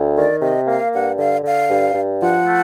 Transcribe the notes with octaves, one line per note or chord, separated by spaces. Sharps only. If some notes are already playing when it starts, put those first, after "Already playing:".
Already playing: D2
D#3 D5
C3 D#5
A#3 F5
G2 F#5
D3 F5
D3 F5
G2
G2
F3 F#5
A3